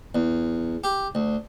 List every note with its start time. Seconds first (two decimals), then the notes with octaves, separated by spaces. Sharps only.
0.15 E2
0.84 G4
1.15 D2